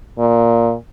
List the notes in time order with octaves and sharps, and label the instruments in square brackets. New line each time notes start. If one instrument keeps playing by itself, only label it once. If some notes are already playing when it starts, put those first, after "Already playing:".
[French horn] A#2